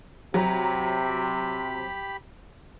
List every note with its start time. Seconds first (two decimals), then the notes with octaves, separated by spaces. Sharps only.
0.34 C3 F#3 G4 A#5 B5